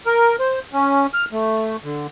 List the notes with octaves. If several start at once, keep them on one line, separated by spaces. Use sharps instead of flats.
A#4
C5
C#4
F6
A3
D3